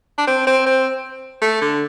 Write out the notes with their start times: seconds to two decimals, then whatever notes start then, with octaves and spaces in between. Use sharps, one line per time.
0.18 D4
0.27 C4
0.47 C4
0.66 C4
1.42 A3
1.62 D3